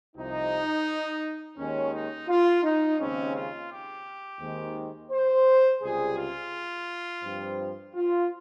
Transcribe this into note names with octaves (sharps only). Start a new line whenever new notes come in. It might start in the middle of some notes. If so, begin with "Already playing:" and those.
C2 C3 F3 D#4
D#2 D#3 G#3 C#4
D#4
F4
D#4
D#2 C#3 G#3 C4 C#4
F4
G4
D#2 D#3 G#3 C4
C5
C#2 C3 G3 G#4
F4
G2 F3 C4
F4